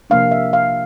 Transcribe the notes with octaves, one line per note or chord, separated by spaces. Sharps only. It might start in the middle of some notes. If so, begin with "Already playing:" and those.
C3 F3 A#3 D4 F5
E5
F5